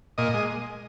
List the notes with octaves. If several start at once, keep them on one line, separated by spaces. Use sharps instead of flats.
A#2 D#5
G#3